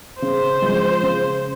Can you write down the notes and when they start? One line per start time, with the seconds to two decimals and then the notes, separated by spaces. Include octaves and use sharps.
0.22 C#3 C5
0.62 F3 G#3
1.03 C#3